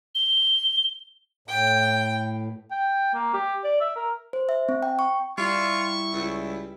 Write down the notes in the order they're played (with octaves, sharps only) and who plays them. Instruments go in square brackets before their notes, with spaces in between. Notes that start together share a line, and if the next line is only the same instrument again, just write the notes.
[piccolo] G7
[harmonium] A2 [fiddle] G5
[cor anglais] G5
A#3
G4
D5
E5
A#4
[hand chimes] C5
E5
C4
G5
C#6
[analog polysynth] G3 E4 E5 [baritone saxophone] F4 [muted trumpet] C#6
[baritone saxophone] C#2